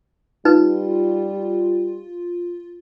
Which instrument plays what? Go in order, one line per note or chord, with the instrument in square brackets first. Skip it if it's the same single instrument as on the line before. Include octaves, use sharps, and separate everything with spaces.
[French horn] G3 [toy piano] D#4 B4 [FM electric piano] F4